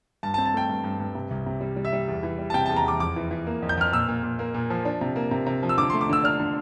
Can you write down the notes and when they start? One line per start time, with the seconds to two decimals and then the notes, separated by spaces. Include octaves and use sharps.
0.23 G2 A5
0.34 A5
0.38 C4
0.45 A5
0.53 A3 G5
0.69 G2
0.84 G2
1.00 G2
1.15 C3
1.31 C2
1.46 C3
1.61 G3
1.76 G3
1.85 E5
1.93 G3
2.08 E2
2.23 E3
2.39 G3
2.50 A5
2.54 C3 G5
2.66 E2 A5
2.76 A#5
2.85 E2 D6
3.00 F2 D6
3.16 E3
3.31 E3
3.46 A#3
3.62 F2
3.69 G6
3.77 F2 F6
3.92 A#2 E6
4.08 A#2
4.23 A#2
4.39 A#3
4.54 A#2
4.70 F3
4.85 D4
5.01 C3
5.16 A#3
5.31 C3
5.47 C3
5.63 F3
5.69 E6
5.78 D3 D6
5.90 A3 C6
6.01 D6
6.09 D3 E6
6.24 D4 F6
6.40 D3